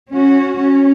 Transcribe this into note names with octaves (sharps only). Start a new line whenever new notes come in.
C#4 F#4
C#4